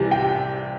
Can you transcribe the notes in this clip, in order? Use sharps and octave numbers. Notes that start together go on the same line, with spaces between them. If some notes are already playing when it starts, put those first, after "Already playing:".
Already playing: C2 C3 E3 G3
G5